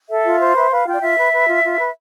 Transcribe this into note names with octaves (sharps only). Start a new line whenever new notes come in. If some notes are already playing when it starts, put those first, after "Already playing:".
A4 E5
F4
C5
B4 E5
B4 F5
F4 G5
D5
F4 E5
B4
B4
F4
F4
B4